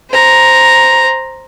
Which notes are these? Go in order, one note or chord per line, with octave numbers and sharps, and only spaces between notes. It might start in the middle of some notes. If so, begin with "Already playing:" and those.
C5 A#5